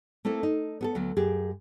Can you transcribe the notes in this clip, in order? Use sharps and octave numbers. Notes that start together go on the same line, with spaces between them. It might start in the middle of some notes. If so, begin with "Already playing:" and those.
A3 A#3 C4 E4 A4
D#4
B3 G#4 A4
D2 F#3 B3
F#2 G4 G#4